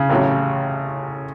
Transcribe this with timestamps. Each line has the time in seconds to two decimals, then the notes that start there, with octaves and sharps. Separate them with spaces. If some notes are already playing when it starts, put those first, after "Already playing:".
Already playing: C#3
0.10 A1 A2 F#3 C#4 G4